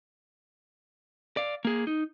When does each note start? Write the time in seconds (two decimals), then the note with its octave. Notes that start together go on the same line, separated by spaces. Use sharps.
1.37 D5 F5
1.65 A#3 G#4
1.87 D#4